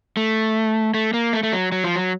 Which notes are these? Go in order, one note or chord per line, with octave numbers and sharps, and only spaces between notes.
A3
A3
A#3
A3
A3
F#3
F#3
F3
F#3